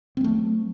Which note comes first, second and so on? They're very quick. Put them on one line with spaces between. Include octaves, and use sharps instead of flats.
C4 G#3 A3 F#3